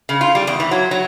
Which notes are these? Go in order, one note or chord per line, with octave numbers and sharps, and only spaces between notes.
C#3
F4
G3
E2
E3
F#3
F#3